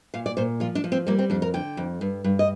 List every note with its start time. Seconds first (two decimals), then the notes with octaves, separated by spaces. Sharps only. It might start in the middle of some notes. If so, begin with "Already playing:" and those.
0.14 A#2 F5
0.26 D5
0.37 A#2 C5
0.60 F3 F4
0.75 D4
0.84 F3
0.92 C4
1.07 G3 A#3
1.19 C4
1.30 F2 D4
1.42 A#4
1.54 D3 G5
1.77 F2
2.01 G2
2.24 G2
2.39 D#5